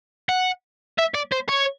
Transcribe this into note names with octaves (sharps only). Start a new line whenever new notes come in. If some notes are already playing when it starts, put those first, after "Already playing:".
F#5
E5
D5
C5
C#5